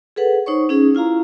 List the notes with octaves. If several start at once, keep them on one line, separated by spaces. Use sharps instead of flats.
G#4 A4 B4 F#5
D#4 C5 C#5 C#6
C#4 D#4 G#4
E4 F4 F5 A#5